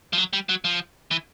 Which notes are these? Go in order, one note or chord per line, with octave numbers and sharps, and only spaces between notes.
F3
F#3
G3
F#3
F3
E3